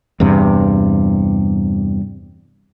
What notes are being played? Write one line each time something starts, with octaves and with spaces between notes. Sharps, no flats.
E2 G2 C3